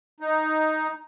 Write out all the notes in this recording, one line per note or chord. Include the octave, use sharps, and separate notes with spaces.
D#4